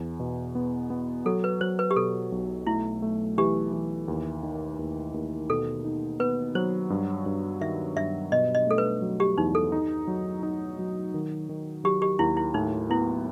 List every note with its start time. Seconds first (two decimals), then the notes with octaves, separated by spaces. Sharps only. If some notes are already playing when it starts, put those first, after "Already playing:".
Already playing: E2
0.20 B2
0.55 B3
0.90 B3
1.26 F#3 A4
1.44 B4
1.61 F#3 C5
1.79 B4
1.91 G4
1.96 B2 A4
2.32 B1
2.66 A3 E4
3.02 A3
3.38 E3 G4
3.73 E3
4.08 D#2
4.43 D#3
4.79 D#2
5.14 D#2
5.49 B2 A4
5.85 D#4
6.20 B3 B4
6.55 F#3 C5
6.90 G2
7.26 G2
7.61 D#3 E5
7.96 G2 E5
8.32 B2 D#5
8.55 D#5
8.67 A3 A4
8.78 B4
9.02 F#3
9.20 G4
9.37 E2 D#4
9.55 A4
9.72 D#4
10.08 F#3
10.43 D#4
10.79 F#3
11.14 D#3
11.49 D#3
11.84 F#3 G4
12.02 G4
12.19 D#2 E4
12.37 E4
12.54 A2 D#4
12.90 B3 E4